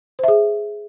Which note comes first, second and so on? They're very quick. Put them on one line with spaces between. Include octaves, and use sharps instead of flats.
C5 E5 G#4